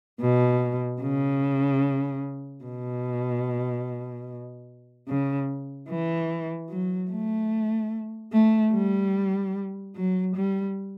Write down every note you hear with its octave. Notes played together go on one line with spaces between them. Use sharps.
B2
C#3
B2
C#3
E3
F#3
A3
A3
G3
F#3
G3